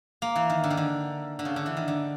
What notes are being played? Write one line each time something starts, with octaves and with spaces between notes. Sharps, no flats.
A#3
E3
D#3
D3
D#3
D3
D3
C#3
D3
E3
D#3
D3